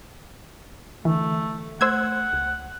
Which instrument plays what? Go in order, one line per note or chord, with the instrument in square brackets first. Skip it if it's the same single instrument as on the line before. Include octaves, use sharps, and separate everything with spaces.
[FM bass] D3 [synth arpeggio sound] E3 [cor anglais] A3
[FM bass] A3 [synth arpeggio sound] C5 E6 G#6 [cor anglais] F#5
[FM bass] C#2